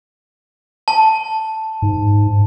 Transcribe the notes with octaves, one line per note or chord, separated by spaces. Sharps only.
A5
G#2